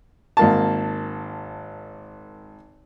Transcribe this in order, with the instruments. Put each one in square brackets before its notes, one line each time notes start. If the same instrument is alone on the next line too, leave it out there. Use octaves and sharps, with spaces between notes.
[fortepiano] G#1 A#3 A5